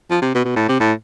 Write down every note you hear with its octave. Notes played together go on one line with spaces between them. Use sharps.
F3
C3
B2
B2
A2
C3
A2